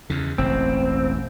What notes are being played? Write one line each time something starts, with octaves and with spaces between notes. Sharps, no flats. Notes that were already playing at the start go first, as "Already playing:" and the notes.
E2 C#3
E1 A1 C4